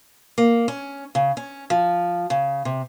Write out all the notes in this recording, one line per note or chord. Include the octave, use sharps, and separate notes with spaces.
A#3
C#4
C#3
C#4
F3
C#3
C3